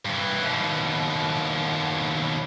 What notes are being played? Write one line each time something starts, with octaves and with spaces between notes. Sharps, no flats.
G2 E3
D#2 B2